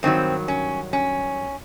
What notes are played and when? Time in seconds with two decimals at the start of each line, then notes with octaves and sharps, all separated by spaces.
0.03 G2 D#3 F#3 C4
0.48 C#4
0.93 C#4